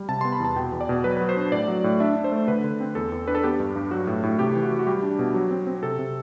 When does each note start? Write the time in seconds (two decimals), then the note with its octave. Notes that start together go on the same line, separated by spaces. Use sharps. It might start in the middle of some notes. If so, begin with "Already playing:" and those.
Already playing: G3
0.09 C3 A5
0.21 B3 C6
0.32 B5
0.40 E2 A5
0.56 B2 G5
0.72 E2
0.81 D5
0.89 B2
1.04 F#3 B4
1.17 F#3 B4
1.29 C5
1.37 D4
1.52 A2 D5
1.68 F#3
1.84 A2
2.00 D4 E5
2.16 D4
2.24 C5
2.32 A3
2.48 D3 B4
2.64 D3
2.80 C4
2.95 E2 A4
3.12 E2
3.28 D4 B4
3.35 A4
3.43 B3 G4
3.60 G2
3.76 G2
3.91 F#3 F#4
4.07 A2
4.23 A2
4.39 C3 G4
4.56 E3
4.63 F#4
4.71 E3
4.79 F#4
4.87 G3 G4
5.03 D4
5.19 B2
5.34 F#3
5.51 C4
5.67 C4
5.83 C3 A4
5.99 C3